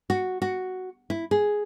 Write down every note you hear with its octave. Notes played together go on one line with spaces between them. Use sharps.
F#4
F#4
E4
G#4